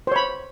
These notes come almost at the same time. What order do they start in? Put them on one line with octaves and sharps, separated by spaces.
C5 C#5 B5